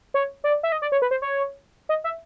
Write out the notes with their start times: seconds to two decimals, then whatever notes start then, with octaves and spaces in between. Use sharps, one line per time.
0.14 C#5
0.44 D5
0.63 E5
0.72 D#5
0.82 D5
0.92 C#5
1.02 B4
1.11 C5
1.22 C#5
1.89 D#5
2.04 E5